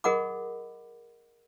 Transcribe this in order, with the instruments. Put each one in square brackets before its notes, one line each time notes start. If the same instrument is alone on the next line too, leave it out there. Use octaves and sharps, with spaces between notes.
[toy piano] G#4 A#4 D#5 F#5 B5 D6